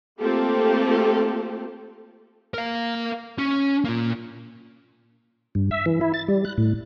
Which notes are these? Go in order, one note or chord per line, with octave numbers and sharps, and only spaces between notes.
A3 A#3 C4 F4 G4 A4
A#4 F5
C#4
A#2 A#3
G2
E5
E3
E4
A6
G3
F#6
A2